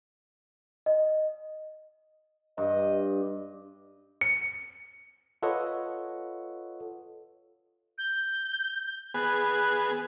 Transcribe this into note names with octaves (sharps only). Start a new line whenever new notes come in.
D#5
G2 D#5
C#7
F4 A4 B4 C#5 D#5 F#5
G6
B3 G#4 F#6